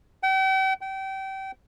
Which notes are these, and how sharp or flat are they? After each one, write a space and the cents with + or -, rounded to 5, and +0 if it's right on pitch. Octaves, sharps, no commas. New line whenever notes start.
G5 -40
G5 -30